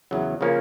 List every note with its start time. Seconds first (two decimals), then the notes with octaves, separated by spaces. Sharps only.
0.11 E2 C#3 F#3
0.41 C#3 F3 A#3 C#4